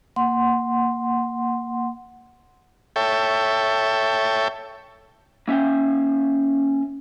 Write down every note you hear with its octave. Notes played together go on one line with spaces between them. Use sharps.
A#3 F#5 C6
A4 C#5 E5 G5
A#3 C#4 E5 F5 G5